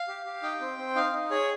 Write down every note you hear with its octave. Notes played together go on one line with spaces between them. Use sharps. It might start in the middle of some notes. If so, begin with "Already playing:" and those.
Already playing: F5
G4
G4
D#4 G5
C4
C4
D#4 F5
D#4
G#4 C#5